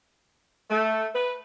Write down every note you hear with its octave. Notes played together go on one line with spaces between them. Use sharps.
A3
B4